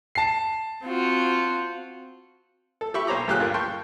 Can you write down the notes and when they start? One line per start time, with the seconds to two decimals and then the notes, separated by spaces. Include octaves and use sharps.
0.15 A5 C7
0.85 C4 F4 F#4
2.81 A4
2.94 G4 E5 B5 C#6
3.07 B1 C5 C#5 A#5 D6
3.28 D2 A#2 G4 G#4 F5 F#6
3.40 G2 F4 A#4
3.54 G5 A5 C6 C#6